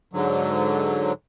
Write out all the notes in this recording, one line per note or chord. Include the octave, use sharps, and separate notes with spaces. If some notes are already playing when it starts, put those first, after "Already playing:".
G#2 D3 F#3